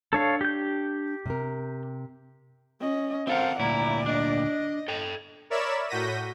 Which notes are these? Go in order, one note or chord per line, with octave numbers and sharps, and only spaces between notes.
D4 A4 C#5 F5 A5
G4 G6
C3 A#4
C#4 D#5
C4 A4 A#4 C5 F5 F#5
D2 A#2 E4 D5 A#5
D4 D#5
A4 G5
A#4 C#5 D5 E5 B5 E7
A2 F#4 G6 A#6 B6 D#7